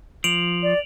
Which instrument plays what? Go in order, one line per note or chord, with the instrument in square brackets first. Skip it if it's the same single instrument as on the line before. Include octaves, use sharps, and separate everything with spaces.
[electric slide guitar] F3 [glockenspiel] D7 F7 F#7
[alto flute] D5